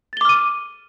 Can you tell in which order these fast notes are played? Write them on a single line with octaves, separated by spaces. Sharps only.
A6 G7 D6 F6 D#7